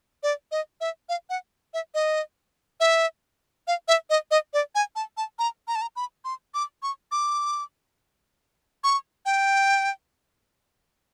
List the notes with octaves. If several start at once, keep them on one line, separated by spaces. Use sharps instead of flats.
D5
D#5
E5
F5
F#5
E5
D#5
E5
F5
E5
D#5
D#5
D5
G#5
A5
A5
A#5
A#5
A5
A#5
B5
C6
D6
C#6
D6
C#6
G5